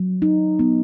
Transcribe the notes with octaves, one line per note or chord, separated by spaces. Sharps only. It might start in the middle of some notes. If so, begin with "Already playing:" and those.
Already playing: F#3
D#4
B3